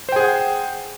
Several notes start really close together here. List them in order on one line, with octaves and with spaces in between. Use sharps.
C5 G5 G#4 F#5